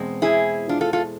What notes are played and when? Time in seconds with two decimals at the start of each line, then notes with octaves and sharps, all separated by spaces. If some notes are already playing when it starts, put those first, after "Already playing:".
Already playing: E2 B2 G#3 C4
0.22 E4 G#4
0.69 D4 F4
0.81 F4 A4
0.93 F4 A4